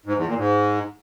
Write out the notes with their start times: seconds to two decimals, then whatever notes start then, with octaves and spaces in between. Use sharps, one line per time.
0.06 G#2
0.16 E2
0.26 A#2
0.36 G#2